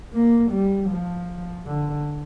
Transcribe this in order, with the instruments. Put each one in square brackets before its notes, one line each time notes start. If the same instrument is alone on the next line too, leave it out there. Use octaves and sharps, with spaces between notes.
[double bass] A#3
G3
F3
D3